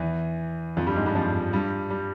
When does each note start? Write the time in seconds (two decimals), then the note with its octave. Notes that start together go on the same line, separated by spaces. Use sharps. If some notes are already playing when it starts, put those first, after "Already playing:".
Already playing: E2 E3
0.77 F2 F3
0.86 G2 G3
0.96 G#2 G#3
1.06 G2 G3
1.15 F2 F3
1.53 G2 G3
1.90 G3